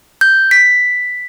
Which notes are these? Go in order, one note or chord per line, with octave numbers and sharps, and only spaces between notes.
G6
B6